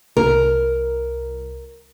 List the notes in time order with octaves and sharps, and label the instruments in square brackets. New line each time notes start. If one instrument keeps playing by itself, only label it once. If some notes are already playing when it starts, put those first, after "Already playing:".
[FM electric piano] C2 [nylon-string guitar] A#4